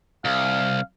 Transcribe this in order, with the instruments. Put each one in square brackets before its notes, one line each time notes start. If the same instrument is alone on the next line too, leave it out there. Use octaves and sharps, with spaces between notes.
[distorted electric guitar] C2 [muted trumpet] F5